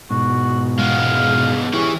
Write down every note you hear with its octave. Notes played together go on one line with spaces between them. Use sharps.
G#2 B2 F#4
G#3 B3 F5
E3 C#4 E4 G4 G#4